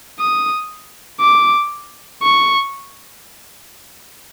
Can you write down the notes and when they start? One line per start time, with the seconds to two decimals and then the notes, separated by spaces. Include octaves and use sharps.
0.20 D#6
1.21 D6
2.23 C#6